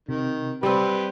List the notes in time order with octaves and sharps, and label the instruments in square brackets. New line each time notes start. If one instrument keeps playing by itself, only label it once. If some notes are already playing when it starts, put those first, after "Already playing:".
[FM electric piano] C3 [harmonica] D#3
[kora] G3 C4 [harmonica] G4 B4